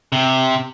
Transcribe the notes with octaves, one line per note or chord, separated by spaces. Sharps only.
C3